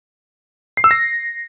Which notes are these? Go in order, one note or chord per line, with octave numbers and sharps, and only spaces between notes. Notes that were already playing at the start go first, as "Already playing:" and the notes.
C7
E6
A#6